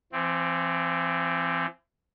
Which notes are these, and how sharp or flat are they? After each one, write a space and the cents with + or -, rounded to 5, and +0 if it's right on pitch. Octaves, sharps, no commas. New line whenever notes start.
E3 +40 C4 +0